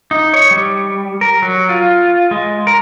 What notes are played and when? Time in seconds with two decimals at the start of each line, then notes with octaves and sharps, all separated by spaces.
0.11 D#4
0.34 C#5
0.51 G3
1.21 A#4
1.42 F#3
1.69 F4
2.31 G#3
2.67 A#4